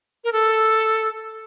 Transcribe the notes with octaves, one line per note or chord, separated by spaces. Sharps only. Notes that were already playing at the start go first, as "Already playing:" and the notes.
A#4
A4